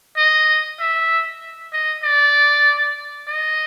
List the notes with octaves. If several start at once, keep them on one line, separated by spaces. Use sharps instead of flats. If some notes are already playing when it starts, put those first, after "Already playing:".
D#5
E5
D#5
D5
D#5